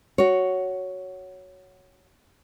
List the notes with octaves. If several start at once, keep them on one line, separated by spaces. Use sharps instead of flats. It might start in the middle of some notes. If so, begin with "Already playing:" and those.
F#4 C#5